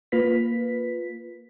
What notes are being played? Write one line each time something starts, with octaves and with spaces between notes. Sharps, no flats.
A#3 F4 B4 B6